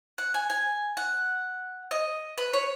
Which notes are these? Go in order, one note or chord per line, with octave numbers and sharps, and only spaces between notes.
F#5
G#5
G#5
F#5
D#5
B4
C#5